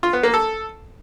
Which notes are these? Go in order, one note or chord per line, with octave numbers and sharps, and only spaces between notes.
F4
B3
A#3
A4